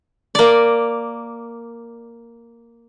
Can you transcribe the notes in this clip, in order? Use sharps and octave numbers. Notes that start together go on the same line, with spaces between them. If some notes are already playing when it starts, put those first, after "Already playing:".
A#3 D5